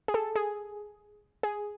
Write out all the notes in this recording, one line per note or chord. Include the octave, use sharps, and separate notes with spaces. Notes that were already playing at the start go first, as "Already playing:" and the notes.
G#4
A4
G#4
G#4